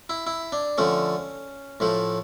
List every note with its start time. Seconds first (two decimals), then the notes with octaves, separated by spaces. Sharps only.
0.09 E4
0.27 E4
0.52 D4
0.78 D3 F3 A3 C#4
1.80 A2 F3 A3